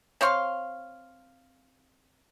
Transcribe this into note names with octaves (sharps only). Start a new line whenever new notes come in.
C4 C#5 F5 C6